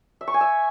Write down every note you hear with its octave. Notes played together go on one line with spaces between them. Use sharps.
E5
C#6
G#5
E5